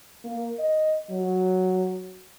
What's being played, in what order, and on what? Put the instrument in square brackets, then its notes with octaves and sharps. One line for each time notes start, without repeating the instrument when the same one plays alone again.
[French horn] A#3
D#5
F#3